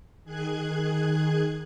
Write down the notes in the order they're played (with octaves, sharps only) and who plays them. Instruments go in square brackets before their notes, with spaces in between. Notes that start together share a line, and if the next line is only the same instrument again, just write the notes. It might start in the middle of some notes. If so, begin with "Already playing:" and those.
[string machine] D#3 G#4 F#6 G#6